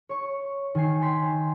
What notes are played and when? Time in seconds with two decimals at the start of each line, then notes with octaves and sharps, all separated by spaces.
0.09 C#5 C#6
0.75 D#3 G#5 C7
1.02 G5 G#5 C6 B6 C7